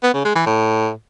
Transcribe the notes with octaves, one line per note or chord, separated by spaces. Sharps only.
B3
C#3
G#3
E3
A2